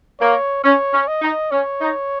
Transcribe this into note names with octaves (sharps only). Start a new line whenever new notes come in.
A#3 C#5
C#4 C#5
C#4
D#5
D#4
C#4 C#5
D#4